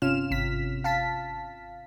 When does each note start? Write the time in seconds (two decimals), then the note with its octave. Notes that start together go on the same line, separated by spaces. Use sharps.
0.02 G1 C3 C#4 F4 F6 E7
0.31 G#1 C3 B6
0.84 F5 A5 B6